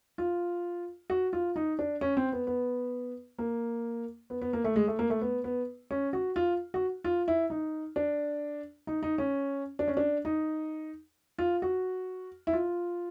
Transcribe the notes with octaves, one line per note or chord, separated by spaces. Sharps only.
F4
F#4
F4
D#4
D4
C#4
C4
B3
B3
A#3
B3
B3
A#3
A3
G#3
A3
A#3
A3
B3
B3
C#4
F#4
F4
F#4
F4
E4
D#4
D4
D#4
D#4
C#4
D4
C#4
D4
D#4
F4
F#4
E4
F4